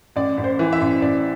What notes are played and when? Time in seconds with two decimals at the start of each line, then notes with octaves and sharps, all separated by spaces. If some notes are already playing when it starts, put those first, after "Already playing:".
0.16 A1 D5
0.37 A1
0.44 C5
0.59 E3
0.73 E5
0.81 A1
1.02 A1 D5